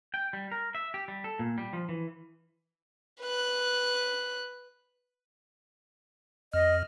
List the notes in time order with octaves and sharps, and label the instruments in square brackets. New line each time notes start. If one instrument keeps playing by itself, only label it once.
[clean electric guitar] G5
G3
A#4
E5
G4
G3
A4
A#2
G3
F3
E3
[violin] B4 F#6
[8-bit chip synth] F2 F6 [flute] D#5